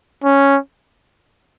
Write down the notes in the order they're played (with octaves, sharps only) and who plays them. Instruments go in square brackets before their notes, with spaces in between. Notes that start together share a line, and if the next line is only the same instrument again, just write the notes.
[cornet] C#4